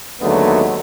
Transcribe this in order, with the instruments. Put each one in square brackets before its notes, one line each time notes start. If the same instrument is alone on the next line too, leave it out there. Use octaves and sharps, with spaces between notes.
[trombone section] D#2 D3 F#3 G#3 A3 B3